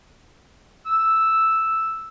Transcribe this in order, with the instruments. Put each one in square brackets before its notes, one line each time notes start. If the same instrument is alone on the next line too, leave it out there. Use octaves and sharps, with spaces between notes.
[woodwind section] E6